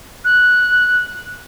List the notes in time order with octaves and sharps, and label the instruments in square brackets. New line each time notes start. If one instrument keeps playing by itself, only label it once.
[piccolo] F#6